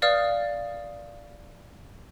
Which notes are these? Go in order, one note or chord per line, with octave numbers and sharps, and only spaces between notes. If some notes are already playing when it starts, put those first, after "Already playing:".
B4 D5 F5 D#6 F6